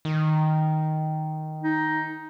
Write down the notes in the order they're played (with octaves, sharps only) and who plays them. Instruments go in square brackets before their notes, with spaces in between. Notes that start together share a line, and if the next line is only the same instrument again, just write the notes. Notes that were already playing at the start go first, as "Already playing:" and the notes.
[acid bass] D#3
[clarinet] D#4